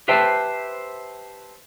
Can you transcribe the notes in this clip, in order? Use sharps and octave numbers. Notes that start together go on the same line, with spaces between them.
G4 B4 C5 E5 G5 A5